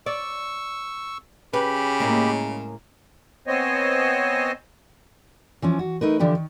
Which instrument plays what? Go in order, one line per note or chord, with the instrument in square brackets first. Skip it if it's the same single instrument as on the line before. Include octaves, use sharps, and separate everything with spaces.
[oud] D5 [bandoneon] C#6 E6
[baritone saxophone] C#3 [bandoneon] G4 B5 [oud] B4
[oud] A2 G#3 A#3
[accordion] B3 C4 C5 C#5 D#5 G#5
[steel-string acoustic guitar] E3 F3 C#4
F#4
A3 D#4 A#4 B4
D3 E3 F3 D4 G4
D#3